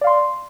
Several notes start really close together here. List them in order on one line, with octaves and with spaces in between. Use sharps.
D5 F5 C6